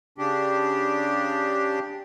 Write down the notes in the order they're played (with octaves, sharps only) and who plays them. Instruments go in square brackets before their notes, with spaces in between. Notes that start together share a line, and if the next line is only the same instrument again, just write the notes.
[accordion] C#3 D4 G4